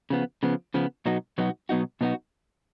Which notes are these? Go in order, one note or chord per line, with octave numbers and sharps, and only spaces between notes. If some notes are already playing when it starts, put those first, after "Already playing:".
C#3 F3 B3
C#3 F3 B3
C#3 F3 B3
B2 F#3 B3 D#4 F#4
B2 F#3 B3 D#4 F#4
B2 F#3 B3 D#4 F#4
B2 F#3 B3 D#4 F#4